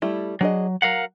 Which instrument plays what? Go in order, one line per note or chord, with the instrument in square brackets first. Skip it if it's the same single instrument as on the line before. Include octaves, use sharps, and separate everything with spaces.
[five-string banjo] G3 A3 E4
[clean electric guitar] F#3 [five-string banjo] D4 G#4 D#5
[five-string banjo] F#3 [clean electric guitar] A#4 F5 F#5